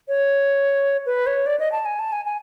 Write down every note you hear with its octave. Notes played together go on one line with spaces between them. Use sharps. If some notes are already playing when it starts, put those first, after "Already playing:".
C#5
B4
C#5
D5
D#5
A5
G#5
A5
G#5
G#5